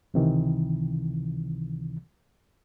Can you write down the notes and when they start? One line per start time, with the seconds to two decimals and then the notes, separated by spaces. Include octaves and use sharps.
0.14 C#2 C3 D#3 E3